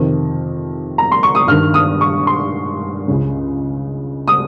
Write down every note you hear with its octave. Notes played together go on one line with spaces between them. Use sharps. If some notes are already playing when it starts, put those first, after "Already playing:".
Already playing: F2 C3 D#3
A#5
C6
C#6
D#6
G2 D#3 F6
D#6
C#6
C6
C#2 C#3
D#6